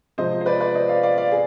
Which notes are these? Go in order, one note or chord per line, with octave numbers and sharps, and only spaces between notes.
C3 F3 G#3 C5 D#5
C5
B4 D5
B4 D5
C5 D#5
D5 F5
D5 F5
D5 F5
G#4